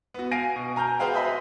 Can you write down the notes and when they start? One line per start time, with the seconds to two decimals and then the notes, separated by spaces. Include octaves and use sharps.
0.14 B3 F#4
0.31 F5 G#5 A#6 C7 D7 D#7
0.56 B2
0.76 G#5 A#5 F6 G6
0.99 F#4 G#4 B4 C5 F5 G5
1.14 B4 C5 D#5 E5 B5